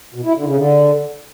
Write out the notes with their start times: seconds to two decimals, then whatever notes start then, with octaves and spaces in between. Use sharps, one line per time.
0.14 B2
0.25 E4
0.35 D3
0.46 C#3
0.56 D3